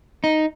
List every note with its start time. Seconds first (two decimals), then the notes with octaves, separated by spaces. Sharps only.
0.24 D#4